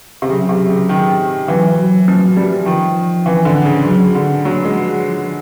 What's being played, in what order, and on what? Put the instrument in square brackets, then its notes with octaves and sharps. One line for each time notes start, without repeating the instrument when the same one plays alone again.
[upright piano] C3
[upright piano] C#3 [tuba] F#3
[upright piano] C3
C#3
D#3
[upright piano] E3 [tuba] F#3
[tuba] F#3
[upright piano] F3
G3
[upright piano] D#3 [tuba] F3
[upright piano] E3
D3
C#3
[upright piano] C#3 [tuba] F#3
[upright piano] D3
F#3
G#3
[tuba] F3
F3